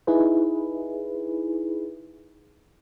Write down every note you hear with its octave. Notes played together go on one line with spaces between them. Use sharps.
D#4 E4 G#4 B4